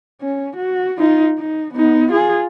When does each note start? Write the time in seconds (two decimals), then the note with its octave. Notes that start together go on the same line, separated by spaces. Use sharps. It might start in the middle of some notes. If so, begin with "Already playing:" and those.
0.21 C#4
0.56 F#4
0.99 D#4 F4
1.38 D#4
1.74 B3 D#4
2.12 F4 G#4